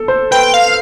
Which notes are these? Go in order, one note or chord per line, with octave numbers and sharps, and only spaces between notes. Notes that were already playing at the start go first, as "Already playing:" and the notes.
Already playing: A4
C5
B4 G5
F5